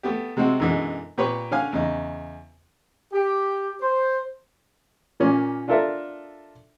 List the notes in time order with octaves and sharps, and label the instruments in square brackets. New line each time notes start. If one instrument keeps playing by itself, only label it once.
[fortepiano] A3 B3 G4
C3 G#3 C4 F#4
F#2 B2 D3 E3 G#3
A#2 G4 B4 C#5
D3 C#4 F5 G#5
E2 C#3 D#4
[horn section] G4
C5
[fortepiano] A#2 A#3 C#4
D4 F4 A4 A#4 E5